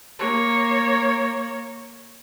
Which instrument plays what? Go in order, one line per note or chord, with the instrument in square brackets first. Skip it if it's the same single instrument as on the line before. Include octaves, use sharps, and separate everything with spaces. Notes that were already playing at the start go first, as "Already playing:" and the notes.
[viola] A#3 C#5